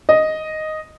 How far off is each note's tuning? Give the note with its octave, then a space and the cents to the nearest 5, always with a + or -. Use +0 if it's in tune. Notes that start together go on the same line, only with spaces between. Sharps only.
D#5 +0